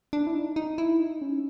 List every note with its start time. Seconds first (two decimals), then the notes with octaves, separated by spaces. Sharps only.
0.13 D4
0.27 E4
0.34 D#4
0.56 D#4
0.78 E4
1.00 D#4
1.21 C#4